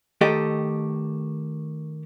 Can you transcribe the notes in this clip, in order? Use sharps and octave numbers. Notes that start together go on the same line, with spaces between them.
D#3 A3 G4 A4 D#5